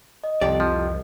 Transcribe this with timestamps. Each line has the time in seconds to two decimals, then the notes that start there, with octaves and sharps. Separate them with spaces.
0.24 D#5
0.41 C2 F2 G4 D5
0.60 F3